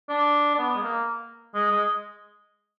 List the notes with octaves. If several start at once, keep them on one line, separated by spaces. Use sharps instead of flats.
D4
D4
B3
G#3
A#3
G#3
G#3